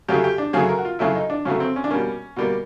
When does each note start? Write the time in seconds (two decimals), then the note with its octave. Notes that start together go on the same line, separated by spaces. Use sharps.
0.08 F#2 C#3 F#3 A3 G4
0.24 G4
0.38 D4
0.53 F#2 C#3 F#3 A3 G#4
0.69 A#4
0.79 F#4
0.85 F4
0.99 F#2 C#3 F#3 A3 E4
1.15 D#4
1.30 D4
1.45 F#2 C#3 F#3 A3 C#4
1.60 C4
1.76 C#4
1.84 D4
1.91 B2 G3 A#3 C#4
2.36 B2 G3 A#3